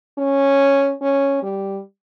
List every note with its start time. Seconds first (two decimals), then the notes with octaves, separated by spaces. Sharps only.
0.18 C#4
1.01 C#4
1.43 G3